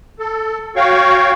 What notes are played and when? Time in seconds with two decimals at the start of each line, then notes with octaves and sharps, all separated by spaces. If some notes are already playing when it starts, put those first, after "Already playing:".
0.19 A4
0.76 F#4 C#5 F5 G5 C#6